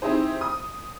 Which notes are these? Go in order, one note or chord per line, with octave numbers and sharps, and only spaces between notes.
C4 D#4 E4 G4 G#4 C5
D#6